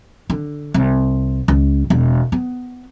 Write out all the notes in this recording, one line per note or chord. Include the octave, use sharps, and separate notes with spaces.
D3
C2
C#2
E1
B3